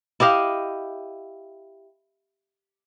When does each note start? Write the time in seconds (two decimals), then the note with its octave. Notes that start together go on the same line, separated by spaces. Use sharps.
0.20 E4 G4 D#5 F5